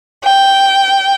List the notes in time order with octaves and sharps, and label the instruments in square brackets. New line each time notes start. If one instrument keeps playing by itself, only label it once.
[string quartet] G5